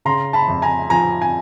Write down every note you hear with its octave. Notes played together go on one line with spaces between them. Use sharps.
C#3 A#5 C6
A5 B5
F2
G#5 A#5
F3 G#5 A#5
G#5